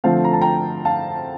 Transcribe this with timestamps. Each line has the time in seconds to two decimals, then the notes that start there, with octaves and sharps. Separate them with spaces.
0.04 D3 F3 A3 C4 F5 A5
0.25 A#5
0.33 A5
0.41 G5 A#5
0.85 F5 A5